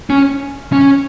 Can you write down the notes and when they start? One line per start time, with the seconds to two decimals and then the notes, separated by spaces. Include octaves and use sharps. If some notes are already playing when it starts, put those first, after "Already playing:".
0.10 C#4
0.72 C#4